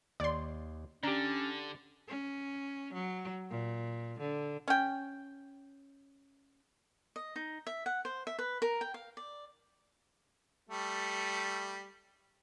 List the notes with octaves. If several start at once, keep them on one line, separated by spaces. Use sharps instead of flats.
D#2 D5 C6
D3 C#4 D4 G4 A#5
C#4
F#3
A#2
D3
C#4 G5
D#5
D#4
E5
F#5
C5
E5
B4
A#4
G5
F5
D5
G3 A3